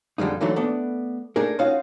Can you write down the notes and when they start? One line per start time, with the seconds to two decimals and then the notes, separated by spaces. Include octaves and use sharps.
0.18 F2 D3 G3 G#3 D#4
0.41 D3 E3 F#3 A3 D#4 F#4
0.56 A3 B3 D4
1.36 A3 D4 D#4 G#4 A#4
1.59 C#4 D#4 F4 F#4 F5